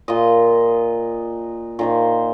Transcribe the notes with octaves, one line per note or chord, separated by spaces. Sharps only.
A#2 F4 D#5
A#2 D#3 C5